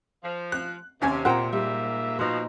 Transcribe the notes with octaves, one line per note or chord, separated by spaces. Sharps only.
F3
F#6
D#2 C3 C#4 G#5
A#2 C5 F#5 G5 A#5
G#2 G3 A#3 E5
B2 F3 D#4 C5